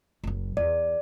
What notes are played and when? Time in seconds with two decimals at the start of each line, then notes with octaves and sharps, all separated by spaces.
0.24 F#1 F#3
0.57 E2 D5